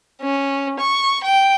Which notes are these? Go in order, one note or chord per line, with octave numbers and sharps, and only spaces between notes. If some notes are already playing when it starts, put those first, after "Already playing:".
C#4
C#6
G5